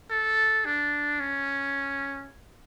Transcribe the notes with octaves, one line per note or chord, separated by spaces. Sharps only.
A4
D4
C#4